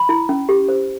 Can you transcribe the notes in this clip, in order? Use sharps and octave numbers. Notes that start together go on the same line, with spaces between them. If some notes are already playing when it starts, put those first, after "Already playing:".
Already playing: B5
E4
C#4
G4
C5